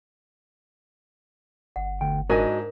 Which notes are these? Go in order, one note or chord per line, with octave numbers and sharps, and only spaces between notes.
G1 F#5
D2 G5
G#2 D4 F#4 A#4 D#5 G#5